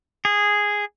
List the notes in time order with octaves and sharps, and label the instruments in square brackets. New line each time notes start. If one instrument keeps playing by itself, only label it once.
[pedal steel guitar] G#4